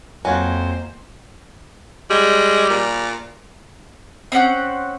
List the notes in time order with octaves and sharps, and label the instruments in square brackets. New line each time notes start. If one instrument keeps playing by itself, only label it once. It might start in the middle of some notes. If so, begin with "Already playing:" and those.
[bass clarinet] F2 [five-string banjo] F#3 F4 F#4 [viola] A#3 C5 [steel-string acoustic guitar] G#5
[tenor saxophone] G3 [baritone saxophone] G#3
[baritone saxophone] A#2
[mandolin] C4 C#4 F#5 G6